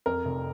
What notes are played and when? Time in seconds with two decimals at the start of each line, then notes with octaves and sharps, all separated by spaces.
0.06 F2 A#4
0.25 F1